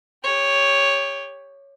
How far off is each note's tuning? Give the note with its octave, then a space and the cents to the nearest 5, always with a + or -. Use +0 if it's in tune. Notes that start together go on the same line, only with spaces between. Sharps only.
G4 +25 C#5 +0